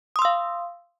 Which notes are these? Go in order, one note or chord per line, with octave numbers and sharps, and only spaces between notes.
F5 C6 D#6 E6